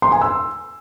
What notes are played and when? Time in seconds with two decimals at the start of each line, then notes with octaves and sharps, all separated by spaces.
0.02 C6
0.12 G#5
0.21 E6